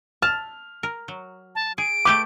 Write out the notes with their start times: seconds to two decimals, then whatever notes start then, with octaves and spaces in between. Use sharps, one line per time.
0.22 A5 F6
0.83 A#4
1.08 F#3
1.55 A5
1.78 G#4 D7
2.05 A3 G4 B4 D6